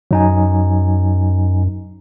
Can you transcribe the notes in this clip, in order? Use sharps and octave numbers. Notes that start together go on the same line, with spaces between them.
F#2 F#3 D#4 G#5